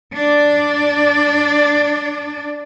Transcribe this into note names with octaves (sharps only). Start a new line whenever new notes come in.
D4 D5